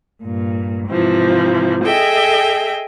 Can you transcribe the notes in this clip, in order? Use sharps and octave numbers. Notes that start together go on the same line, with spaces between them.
G2 A#2
G#2 C3 E3 F3
G#4 A4 D#5 E5 G5